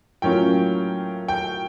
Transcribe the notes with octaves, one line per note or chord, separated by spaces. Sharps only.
A2 F#3 A#3 C#4 F4 G5
G5